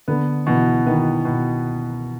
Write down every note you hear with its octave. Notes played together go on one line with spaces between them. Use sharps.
D3 B3
B2 E3
D#3 B3
B2